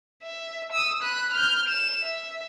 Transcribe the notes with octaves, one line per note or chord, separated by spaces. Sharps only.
E5
D#6 E6
B5 F#6
F6 G6
E7
E5